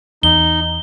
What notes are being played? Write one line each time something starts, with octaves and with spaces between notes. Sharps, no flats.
E2 D#4 G7